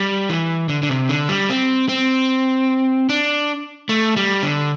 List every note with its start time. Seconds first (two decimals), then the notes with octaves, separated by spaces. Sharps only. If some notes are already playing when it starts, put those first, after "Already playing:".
Already playing: G3
0.29 E3
0.69 D3
0.83 D3
0.89 C3
1.09 D3
1.29 G3
1.50 C4
1.89 C4
3.09 D4
3.89 A3
4.16 G3
4.43 D3